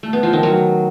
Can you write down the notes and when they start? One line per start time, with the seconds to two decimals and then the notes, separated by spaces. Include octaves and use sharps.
0.03 A3
0.13 B3
0.23 F3
0.33 D#3
0.43 F#3